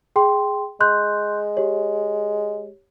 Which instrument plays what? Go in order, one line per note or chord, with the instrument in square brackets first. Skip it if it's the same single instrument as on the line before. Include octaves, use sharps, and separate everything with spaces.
[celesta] G#4 G5 C6
[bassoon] G#3 [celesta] C6 F#6 G6
[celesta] G4 C#5